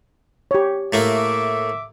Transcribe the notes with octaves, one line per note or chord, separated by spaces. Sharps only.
G4 C#5
A2 A3 A#3 E5 D6